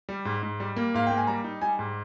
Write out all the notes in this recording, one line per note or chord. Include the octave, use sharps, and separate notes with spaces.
G3
G#2
G#2
G3
A#3
G#2 F5
A#3 G5
G#5
G3 A#5
D#4
G3 G#5
G#2